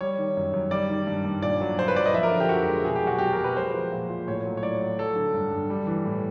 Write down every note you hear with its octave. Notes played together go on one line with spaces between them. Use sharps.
G3 C#5
D#3
F#2
F#2
G3 D5
D#3
G2
G2
A#2 D5
F#3
A#2 C5
B4
F#3 D5
D#5
F3 E5
A#4
D3
G4
F2 F#4
G#3
B2 G#4
G4
F#3 F#4
B2 G4
A#4
F#3
B4
G#3 C5
F3
A#2
A#2
A2 C#5
F#3
C#5
A2 D5
F#3
F#3 A4
D3
G2
G2
G3
E3
A2